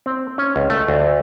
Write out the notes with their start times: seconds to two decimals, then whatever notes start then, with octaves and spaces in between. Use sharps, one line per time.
0.06 C4
0.38 C#4
0.56 C#2
0.70 A3
0.88 D2